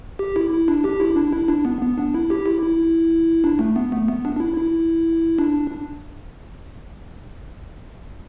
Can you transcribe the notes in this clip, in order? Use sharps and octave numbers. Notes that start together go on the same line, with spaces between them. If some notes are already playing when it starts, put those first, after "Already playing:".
G4
E4
E4
D4
G4
E4
D4
E4
D4
B3
B3
D4
E4
G4
E4
E4
D4
A3
B3
A3
B3
D4
D4
E4
E4
D4